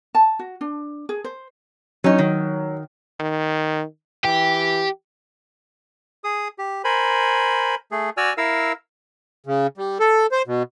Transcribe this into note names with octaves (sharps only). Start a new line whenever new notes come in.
A5
F#4
D4
G#4
C5
F#3 C#4 D#4
D#3
D#3
E3 G4
G#4 D#6
G4
A#4 C5 G#5 B5
A3 G#4
F#4 D5 G#5 E6 F6
E4 A#4 F5 E6
C#3
G3
A4
C5
B2